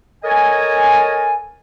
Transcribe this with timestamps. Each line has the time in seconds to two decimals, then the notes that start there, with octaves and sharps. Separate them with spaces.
0.24 A4 A#4 C#5 D#5 G#5